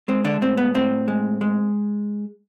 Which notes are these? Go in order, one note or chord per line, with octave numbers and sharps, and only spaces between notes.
G#3 C4
D3 D4
A2 C4
B3
A2 C4
G#3
G#3